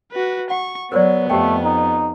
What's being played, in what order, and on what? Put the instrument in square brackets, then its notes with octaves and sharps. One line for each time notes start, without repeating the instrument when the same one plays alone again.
[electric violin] F#4 B4
[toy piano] F#5 [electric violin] C#6
[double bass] F#3 [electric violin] B3 [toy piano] A#4 C5 D5
[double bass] F2 [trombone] A3 [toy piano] G4 G5
[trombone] D#4